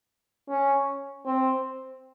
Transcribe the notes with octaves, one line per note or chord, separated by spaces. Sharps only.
C#4
C4